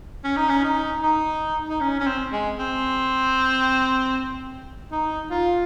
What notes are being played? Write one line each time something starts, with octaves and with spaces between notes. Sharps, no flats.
C#4
D#4
C#4
D#4
D#4
D#4
C#4
C#4
C4
G#3
C4
D#4
F4